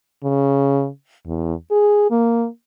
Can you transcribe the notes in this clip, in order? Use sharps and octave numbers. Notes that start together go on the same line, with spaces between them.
C#3
E2
G#4
A#3